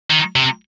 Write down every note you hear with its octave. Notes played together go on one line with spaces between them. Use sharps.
D#3
C3